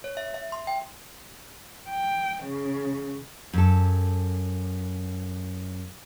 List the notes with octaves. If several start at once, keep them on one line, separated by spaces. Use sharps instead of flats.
C#5
E5
E5
C6
G5
G5
C#3
F#2 A4